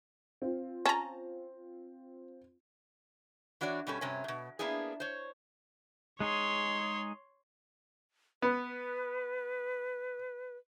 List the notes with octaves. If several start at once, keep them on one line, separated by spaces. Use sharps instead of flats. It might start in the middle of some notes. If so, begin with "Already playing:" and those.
C4 F4
C#4 A5 A#5
E3 D4 F#4 C#5 D5
B2 G3 C#4 A4
G2 C3 C#4
G#2 B2
A#3 B3 D4 E4 G#4
C5 C#5
G#3 D#4 G#4 C#5 C6
B3 B4